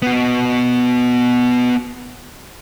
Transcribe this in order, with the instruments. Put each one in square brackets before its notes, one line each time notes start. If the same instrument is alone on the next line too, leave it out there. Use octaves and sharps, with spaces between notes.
[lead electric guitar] B3 F#4